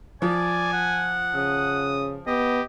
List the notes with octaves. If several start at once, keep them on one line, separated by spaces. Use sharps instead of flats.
F3 D5 G#5
F#5
C#3 D#6
B3 G4 D#5